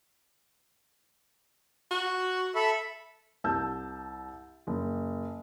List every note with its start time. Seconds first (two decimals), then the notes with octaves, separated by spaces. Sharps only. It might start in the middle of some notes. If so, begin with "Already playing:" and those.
1.91 F#4
2.55 A4 E5 B5
3.44 C2 A5 E6 G6
4.67 F#1